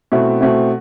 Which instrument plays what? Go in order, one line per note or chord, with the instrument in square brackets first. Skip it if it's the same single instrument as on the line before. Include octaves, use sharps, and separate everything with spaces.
[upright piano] B2 A3 C4 E4
B2 A3 C4 E4